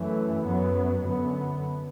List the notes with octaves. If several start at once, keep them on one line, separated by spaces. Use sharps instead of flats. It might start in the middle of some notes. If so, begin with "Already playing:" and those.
Already playing: F#2 E3 A3
F#2 F#3 B3
F#2 D3 B3